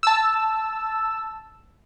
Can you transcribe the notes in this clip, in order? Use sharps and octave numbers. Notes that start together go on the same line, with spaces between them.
A5 E6